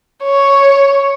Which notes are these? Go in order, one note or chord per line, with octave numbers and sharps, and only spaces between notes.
C#5